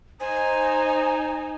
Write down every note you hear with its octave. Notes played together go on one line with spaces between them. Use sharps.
D#4 C5 G#5